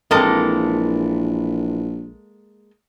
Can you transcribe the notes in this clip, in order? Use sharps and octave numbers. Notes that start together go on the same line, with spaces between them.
A#1 E3 G#3 A#3 C4 A4